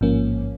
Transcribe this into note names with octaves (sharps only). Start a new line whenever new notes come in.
A1 G#2 F3 A#3 C#4